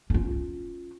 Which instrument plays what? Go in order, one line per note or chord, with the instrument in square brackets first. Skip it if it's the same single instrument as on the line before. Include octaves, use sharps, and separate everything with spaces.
[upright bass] C#4 F4